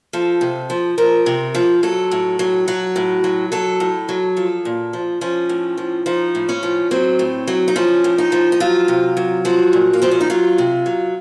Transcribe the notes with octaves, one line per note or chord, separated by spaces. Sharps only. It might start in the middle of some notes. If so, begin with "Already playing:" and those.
F3 A4
C3
F3
F3 A#4
C3
F3
F#3 A4
A2
F#3
F#3 F#4
A2
F#3
F#3 A4
A2
F#3
F3 A4
A#2
F3
F3 C#4
A2
F3
F3 D#4
A2
C#4
F3
F#3 C4
A2
F#3
D#4
F3 C#4
A2
D#4
F3
D#4
F#3 F4
C3
F#3
F3 F#4
A#2
A#3
F3 C4
C#4
D#4
F#3 F4
C3
F#3